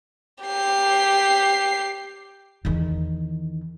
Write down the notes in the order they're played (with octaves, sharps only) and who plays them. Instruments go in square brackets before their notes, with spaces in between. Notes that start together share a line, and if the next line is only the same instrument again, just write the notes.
[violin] G4 C7
[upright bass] E2 D#3